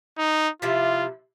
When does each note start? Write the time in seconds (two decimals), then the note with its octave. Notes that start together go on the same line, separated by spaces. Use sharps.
0.18 D#4
0.62 C3 F3 E4 F4